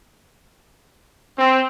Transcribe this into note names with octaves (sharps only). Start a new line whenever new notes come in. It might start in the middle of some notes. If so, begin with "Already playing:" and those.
C4